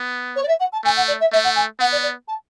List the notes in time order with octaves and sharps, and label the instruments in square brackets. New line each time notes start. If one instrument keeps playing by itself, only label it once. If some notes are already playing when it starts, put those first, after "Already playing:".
Already playing: [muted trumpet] B3
[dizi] C#5
D5
E5
F#5
A5
[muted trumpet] A3 [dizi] G#5
[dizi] F#5
D5
E5
[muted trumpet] A3 [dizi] E5
[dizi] F#5
G#5
[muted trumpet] B3 [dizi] F#5
[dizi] D5
D5
A5